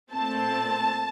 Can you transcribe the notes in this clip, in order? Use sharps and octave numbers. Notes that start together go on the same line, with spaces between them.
A#2 A3 C4 A5